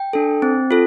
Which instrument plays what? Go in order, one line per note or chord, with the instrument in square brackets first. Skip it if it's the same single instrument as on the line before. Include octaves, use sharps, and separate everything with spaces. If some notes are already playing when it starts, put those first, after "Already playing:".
Already playing: [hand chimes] G5
D4 A4
C4
F4 A4